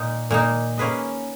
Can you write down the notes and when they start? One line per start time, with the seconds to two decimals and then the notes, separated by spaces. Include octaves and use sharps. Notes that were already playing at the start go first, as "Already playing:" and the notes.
Already playing: A#2 A#3 D#4
0.31 A#2 A#3 D#4
0.77 A#3 C#4 G#4 B4 D#5